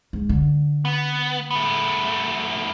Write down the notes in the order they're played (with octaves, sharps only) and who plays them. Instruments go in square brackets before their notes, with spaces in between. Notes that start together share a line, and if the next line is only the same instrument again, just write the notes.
[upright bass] G#2
D3
[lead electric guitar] B3
A3 B3